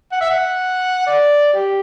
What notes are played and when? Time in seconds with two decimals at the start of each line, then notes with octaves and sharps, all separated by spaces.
0.12 F#5
0.21 E5
0.30 F#5
1.07 D5
1.54 G4